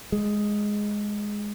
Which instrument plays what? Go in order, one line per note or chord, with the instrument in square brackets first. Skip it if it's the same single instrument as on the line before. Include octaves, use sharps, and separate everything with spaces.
[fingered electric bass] G#3